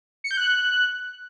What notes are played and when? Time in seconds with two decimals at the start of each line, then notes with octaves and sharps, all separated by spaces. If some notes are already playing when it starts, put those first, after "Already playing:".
0.24 C#7
0.31 G6
0.37 F#6